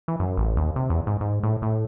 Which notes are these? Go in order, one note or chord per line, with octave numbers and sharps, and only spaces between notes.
E3
F#2
A1
D#2
C3
E2
G#2
G#2
A2
A2